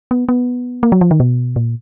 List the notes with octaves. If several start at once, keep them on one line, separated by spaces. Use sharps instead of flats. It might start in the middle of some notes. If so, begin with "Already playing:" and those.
B3
B3
A#3
F#3
F3
D#3
B2
A#2